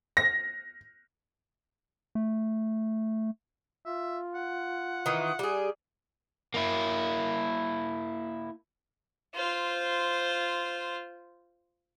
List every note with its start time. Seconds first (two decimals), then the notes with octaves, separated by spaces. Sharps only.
0.17 A#6
2.15 A3
3.85 F4 E5
4.35 F#5
5.06 D#3 E3
5.39 G3 G#4
6.54 A#3 E4
9.35 F4 C5